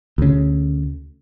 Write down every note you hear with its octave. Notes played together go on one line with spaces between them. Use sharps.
D2 C#3